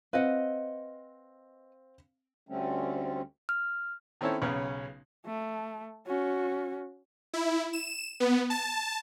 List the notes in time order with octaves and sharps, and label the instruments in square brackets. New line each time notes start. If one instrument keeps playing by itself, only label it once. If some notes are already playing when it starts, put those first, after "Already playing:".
[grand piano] C4 F5 [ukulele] B4 D#5 F#5
[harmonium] D2 D3 G3 A3 C4 C#4
[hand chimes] F6
[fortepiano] D#3 C4 C#4 E4 A4 C#5
B1 C#3 B3 C#4 C#5
[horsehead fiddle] A3
C#4 F#4
[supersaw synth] E4
E7
B3
A5